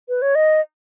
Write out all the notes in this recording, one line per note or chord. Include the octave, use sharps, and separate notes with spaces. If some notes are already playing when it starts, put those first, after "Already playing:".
B4
C#5
D#5